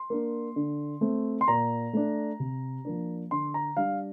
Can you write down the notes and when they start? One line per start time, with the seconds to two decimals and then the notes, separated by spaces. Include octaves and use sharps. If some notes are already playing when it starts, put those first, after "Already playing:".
Already playing: C6
0.10 A#3 D4
0.56 D3
1.01 A3 C4
1.41 C6
1.48 A#2 A#5
1.93 A3 D4
2.40 C3
2.85 F3 A#3 D4
3.31 D3 C6
3.54 A#5
3.77 G3 D4 F5